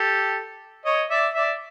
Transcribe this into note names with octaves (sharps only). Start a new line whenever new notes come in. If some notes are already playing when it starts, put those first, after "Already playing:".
Already playing: G4 A4
C#5 D#5
D5 E5
D5 E5